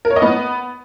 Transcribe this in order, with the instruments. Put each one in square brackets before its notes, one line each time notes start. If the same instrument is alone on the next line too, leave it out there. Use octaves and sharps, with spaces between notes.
[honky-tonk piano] A#4
C#5
D#5
B3